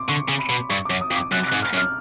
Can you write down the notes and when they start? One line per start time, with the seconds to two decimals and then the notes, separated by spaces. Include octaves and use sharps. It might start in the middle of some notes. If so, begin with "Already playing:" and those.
Already playing: C6 D6
0.08 D3 C#6
0.28 C#3
0.39 B5
0.49 B2
0.69 G2 C#6
0.85 F#2 D6
1.01 D#6
1.11 F2
1.16 D6
1.32 F#2 F#6
1.47 G#2 F#6
1.62 F6
1.73 F#2
1.78 F6